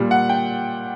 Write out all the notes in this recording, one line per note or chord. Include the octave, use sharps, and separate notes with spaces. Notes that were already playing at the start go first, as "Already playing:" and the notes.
Already playing: A#2 G3
F#5
G5